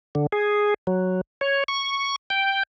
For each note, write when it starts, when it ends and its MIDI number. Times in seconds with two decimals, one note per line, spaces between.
0.15 0.27 50
0.32 0.74 68
0.87 1.21 54
1.41 1.64 73
1.68 2.16 85
2.30 2.63 79